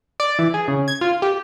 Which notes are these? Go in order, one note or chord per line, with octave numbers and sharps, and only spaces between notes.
D5
E3
G#4
C#3
G#6
F4
G4